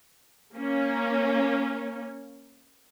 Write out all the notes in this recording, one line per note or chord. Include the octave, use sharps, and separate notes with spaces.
A#3 C#4